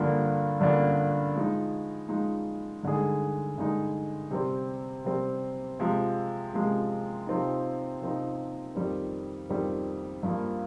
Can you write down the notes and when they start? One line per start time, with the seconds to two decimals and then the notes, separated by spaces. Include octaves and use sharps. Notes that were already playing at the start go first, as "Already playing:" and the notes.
Already playing: G2 D3 F3 A#3 D4
0.60 G2 D3 F3 A#3 D4
1.35 F3 G#3 D#4
2.09 F3 G#3 D#4
2.83 G2 D3 G#3 D#4 G#4
3.58 G2 D3 G#3 D#4 G#4
4.31 C3 G3 C4
5.04 C3 G3 C4
5.79 C3 F3 G#3
6.53 C3 F3 G#3
7.27 C3 F3 C4 D#4
8.01 C3 F3 C4 D#4
8.75 F2 D#3 G3 C4
9.50 F2 D#3 G3 C4
10.23 G2 F3 A#3